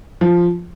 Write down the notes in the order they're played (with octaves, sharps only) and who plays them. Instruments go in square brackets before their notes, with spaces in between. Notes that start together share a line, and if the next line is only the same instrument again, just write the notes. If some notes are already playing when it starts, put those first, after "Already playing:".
[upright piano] F3